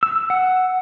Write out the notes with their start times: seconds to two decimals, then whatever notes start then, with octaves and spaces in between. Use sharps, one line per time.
0.03 E6
0.30 F#5